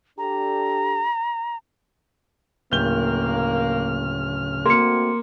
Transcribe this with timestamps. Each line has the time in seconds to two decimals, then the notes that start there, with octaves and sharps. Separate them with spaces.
0.18 D4 G4 A4 A#5
2.72 D1 C#3 A#3 F6 G6 G7
4.66 A3 A#3 C4 F#4 C6 C#7